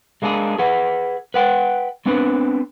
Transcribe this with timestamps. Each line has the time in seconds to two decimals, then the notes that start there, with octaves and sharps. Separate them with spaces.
0.22 G#3 A#3 D4 E4 G#4
0.59 G#4 B4 F#5
1.34 B4 F#5 G5
2.06 B3 C4 D4 B4